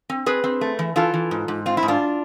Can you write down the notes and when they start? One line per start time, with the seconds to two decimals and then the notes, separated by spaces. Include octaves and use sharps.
0.10 C4
0.26 C4 G#4 B4
0.44 C4
0.61 A3
0.79 E3
0.96 E3 F4 A4
1.14 E3
1.31 G#2
1.48 G#2
1.66 C4 F4
1.77 E4
1.83 G#2
1.88 D4 F4